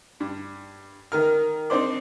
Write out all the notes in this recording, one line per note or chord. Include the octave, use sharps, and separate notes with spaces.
G2
D#3 A#4 F6
C4 D4 D#4 C5 D5